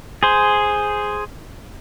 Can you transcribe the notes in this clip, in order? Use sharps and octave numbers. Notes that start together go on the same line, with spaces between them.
G#4 C5